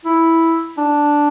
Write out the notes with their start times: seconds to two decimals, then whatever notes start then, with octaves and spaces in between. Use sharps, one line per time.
0.05 E4
0.78 D4